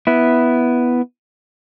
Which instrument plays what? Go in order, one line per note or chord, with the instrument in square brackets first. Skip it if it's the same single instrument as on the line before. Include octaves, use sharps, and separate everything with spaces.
[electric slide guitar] B3 E4